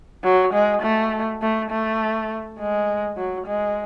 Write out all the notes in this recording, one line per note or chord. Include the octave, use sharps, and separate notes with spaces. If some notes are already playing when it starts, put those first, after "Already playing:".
F#3
G#3
A3
A3
A3
G#3
F#3
G#3